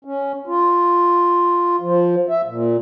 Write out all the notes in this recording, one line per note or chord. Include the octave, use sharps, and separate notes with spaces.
C#4
F4
F3
E5
A#2